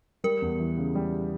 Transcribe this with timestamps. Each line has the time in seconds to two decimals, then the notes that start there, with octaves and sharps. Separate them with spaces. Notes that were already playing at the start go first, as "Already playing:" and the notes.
0.24 G3 A#4
0.42 E2
0.60 E3
0.78 C#3
0.95 G3